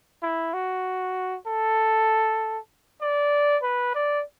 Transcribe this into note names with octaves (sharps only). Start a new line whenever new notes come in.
E4
F#4
A4
D5
B4
D5